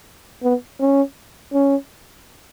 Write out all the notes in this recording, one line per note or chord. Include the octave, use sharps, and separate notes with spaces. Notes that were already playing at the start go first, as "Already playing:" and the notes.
B3
C#4
C#4